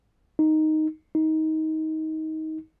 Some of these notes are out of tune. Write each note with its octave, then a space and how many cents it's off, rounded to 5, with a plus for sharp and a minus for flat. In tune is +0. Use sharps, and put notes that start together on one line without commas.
D#4 +0
D#4 +20